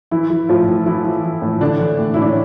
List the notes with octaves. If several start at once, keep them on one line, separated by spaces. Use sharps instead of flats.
E3 E4
E3
A2 F3 F4
A2
E3 E4
E3
E3
A2
D3 E3 D4
E3
A2
E4
A2 D4
C#4